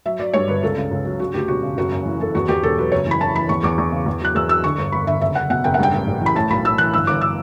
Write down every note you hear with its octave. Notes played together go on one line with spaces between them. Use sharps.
F#3 E5
F#3 D5
G2 C#5
G1 B4
C#2 A4
C#3
C#2
F#3
C#3 F#4
D2 G4
E1 F#4
C#3
F#1 F#4
F#2
E3
E3 A4
E2 F#4
E2 G4
E1 A4
F#3 B4
F#1 C#5
E3 B5
E3 A5
E3 B5
E2 C#6
E2 D6
E2
C#3
E2
F#3 F#6
E2 E6
F#3 E6
D3 C#6
G1
G1 B5
D3 E5
F#1 E5
F#1 F#5
B2 F#5
F#1 G5
F#5
G2 G5
A1
A1
E3
B5
A2 A5
B1 B5
A2 E6
E3 F#6
G1 E6
G1 D6
E6